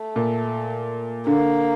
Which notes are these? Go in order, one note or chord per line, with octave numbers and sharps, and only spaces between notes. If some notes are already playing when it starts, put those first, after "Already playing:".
Already playing: A3
A#2
D3 A#3